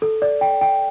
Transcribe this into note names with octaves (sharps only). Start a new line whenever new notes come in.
A4
D5
G5
G5